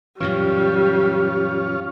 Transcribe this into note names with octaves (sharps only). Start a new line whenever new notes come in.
F#2 A#2 E3 G3 C#4 F4